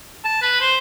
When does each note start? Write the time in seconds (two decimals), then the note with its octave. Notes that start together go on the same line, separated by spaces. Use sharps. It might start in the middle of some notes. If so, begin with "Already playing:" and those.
0.24 A5
0.42 B4
0.61 C5